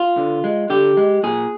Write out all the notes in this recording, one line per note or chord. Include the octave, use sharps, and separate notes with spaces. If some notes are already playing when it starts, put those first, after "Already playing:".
Already playing: F4
D3
G#3
D3 G4
G#3
A#2 G#4